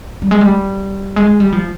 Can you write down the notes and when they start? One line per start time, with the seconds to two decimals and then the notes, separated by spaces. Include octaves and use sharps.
0.22 G3
0.31 G#3
0.41 G3
1.16 G#3
1.40 G3
1.52 F3